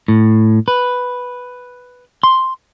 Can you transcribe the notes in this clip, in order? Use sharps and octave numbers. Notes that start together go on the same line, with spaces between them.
A2
B4
C6